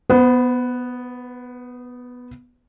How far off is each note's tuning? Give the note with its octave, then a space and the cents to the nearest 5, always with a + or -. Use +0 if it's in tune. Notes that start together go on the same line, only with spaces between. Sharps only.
B3 +0 C5 -45